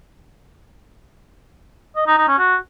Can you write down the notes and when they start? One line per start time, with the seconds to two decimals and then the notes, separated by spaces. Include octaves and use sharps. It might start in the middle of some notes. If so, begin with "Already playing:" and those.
1.96 D#5
2.07 D#4
2.17 D#4
2.28 C#4
2.39 F#4